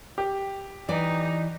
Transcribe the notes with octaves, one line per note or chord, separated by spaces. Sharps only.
G4
E3 D#4 D5